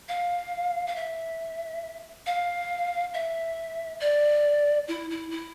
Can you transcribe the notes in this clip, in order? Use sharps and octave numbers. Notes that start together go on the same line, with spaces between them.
F5
F5
E5
F5
E5
D5
E4
E4
E4